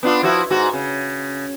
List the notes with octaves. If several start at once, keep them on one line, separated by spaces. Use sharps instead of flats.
B3 D4 F4
F3 E4 F#4
G#2 F#4
C#3